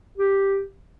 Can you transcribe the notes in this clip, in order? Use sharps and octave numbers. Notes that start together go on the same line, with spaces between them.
G4